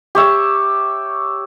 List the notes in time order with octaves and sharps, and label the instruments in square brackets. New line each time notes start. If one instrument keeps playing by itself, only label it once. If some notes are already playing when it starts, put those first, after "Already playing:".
[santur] G4 C#5 E5